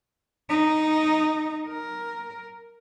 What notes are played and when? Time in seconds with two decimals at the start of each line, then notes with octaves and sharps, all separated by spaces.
0.49 D#4
1.68 A#4